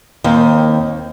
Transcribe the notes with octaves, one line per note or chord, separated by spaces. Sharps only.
D#2 C4